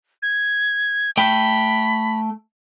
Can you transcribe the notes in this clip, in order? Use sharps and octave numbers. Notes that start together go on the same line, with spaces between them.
G#6
A3 G5 B5